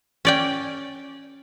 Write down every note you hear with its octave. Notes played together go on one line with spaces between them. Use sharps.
C#4 D5 G5